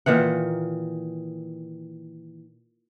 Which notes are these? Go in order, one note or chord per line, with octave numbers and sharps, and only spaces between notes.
A#2 D#3 E3 F#5